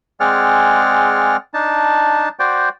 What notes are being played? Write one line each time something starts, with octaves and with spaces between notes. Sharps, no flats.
G#3 C4 G#4 D5 F#5 F6
D4 D#4 A5
F#4 C5 D5 G5